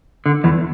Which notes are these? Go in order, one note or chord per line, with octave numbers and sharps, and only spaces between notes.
D3
E2 E3